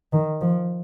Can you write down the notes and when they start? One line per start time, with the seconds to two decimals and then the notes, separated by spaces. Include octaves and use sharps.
0.13 D#3
0.41 F3